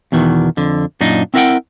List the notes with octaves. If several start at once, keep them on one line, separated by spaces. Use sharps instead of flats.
E2 B2 D#3 E3
F2 D3
F#2 A#2 D4 D#4
C4 E4 A#4 B4 F#5 G5